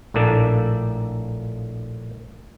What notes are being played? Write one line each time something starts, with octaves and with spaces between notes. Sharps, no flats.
A#1 A2 A#3 D4 A4